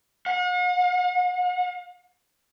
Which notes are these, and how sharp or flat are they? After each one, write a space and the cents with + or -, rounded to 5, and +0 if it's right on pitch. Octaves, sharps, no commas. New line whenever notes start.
F#5 -45